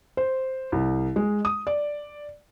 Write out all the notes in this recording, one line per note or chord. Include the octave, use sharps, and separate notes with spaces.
C5
C2
G#3
D#6
D5